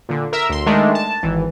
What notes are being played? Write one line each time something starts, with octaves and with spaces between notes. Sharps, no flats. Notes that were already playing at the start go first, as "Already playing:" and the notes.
A#2 D3
A#4 E5 E6
D2 C6
D#3 G#3 A3 D4
A5
G#1 E3